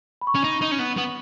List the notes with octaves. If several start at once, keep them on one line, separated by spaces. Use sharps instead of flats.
B5
C#6
C#4
D#4
D#4
C#4
B3
B3